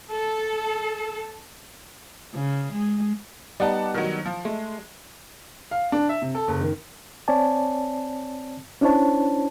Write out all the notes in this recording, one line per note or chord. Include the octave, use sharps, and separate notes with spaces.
A4
C#3
G#3
G3 B3 D#4 D5 F#5 A5
D#3 F#3
F3
G#3 A3
F5
D4
E5
C3
A4
F#1
D#3
C4 C#5 D5 G#5 A5
C#4 D4 E4 C5 C#5 A5